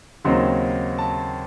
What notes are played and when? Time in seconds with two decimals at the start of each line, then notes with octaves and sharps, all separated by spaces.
0.24 D#2 C#3 F#3 C4 D#4 C6
0.98 A5